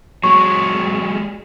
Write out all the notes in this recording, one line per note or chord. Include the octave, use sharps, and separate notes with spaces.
F#3 G#3 C#6